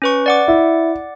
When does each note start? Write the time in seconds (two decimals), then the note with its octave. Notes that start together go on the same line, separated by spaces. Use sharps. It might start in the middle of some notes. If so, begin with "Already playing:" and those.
0.02 C#4 B4 C#6
0.26 D5 F#5 D6
0.48 E4